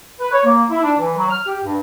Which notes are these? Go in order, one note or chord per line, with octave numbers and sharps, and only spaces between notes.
B4
C#5
A#3
E4
D4
E3
F#3
F6
G4
G2